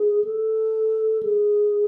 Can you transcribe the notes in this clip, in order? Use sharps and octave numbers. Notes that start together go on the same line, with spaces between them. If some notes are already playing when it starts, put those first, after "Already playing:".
Already playing: G#4
A4
G#4